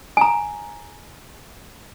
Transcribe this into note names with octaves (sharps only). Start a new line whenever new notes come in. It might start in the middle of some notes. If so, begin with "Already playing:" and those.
G#5 A#5